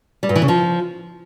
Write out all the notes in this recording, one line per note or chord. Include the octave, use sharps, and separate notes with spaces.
G3
G2
E3
C#3
F3